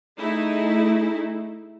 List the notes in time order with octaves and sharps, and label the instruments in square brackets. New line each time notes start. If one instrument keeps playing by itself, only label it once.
[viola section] A3 D#4 E4 G#4